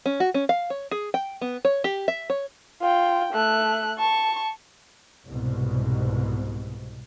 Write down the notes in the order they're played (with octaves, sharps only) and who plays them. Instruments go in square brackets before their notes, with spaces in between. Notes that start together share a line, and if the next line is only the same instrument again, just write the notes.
[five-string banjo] C#4
F#4
C#4
F5
C#5
G#4
G5
B3
C#5
G4
E5
C#5
[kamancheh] F4 G5
A3 F#6
A5 C#6
[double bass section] C2 G#2 B2